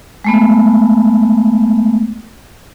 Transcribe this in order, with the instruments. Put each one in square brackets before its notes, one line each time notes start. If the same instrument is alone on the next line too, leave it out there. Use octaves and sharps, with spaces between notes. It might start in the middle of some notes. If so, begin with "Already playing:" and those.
[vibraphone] G#3 A3 B3